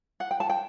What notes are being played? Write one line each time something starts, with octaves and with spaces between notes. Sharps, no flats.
F#5
G5
A5
G5